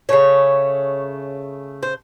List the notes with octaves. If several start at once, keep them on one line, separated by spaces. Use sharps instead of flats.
C#3 F3 A3 C#5
C5